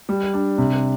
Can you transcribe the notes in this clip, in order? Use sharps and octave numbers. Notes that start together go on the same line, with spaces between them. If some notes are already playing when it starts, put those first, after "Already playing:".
G3
D4
C3